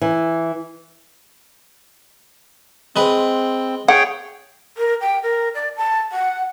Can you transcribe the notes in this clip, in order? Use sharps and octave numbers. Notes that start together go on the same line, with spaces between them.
E3
G#3 C4 B4
G#4 C#5 F#5 G5
A#4
G5
A#4
D5
A5
F#5